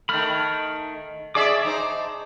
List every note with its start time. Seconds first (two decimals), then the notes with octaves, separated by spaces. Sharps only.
0.09 D#3 A3 B5 F6
1.35 G#4 D5 E5 A5 C#6 D6
1.65 D#4 C5